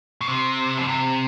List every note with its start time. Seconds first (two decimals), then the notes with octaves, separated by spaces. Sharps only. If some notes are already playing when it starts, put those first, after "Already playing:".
0.21 B2
0.28 C3
0.77 B2
0.88 C3